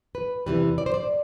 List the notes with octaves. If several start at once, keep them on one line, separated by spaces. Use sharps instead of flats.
B4
E2 C3 E3 G3 B4
D5
C5
D5